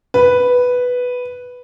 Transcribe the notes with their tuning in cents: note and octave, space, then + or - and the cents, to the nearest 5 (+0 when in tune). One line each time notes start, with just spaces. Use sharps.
B4 +0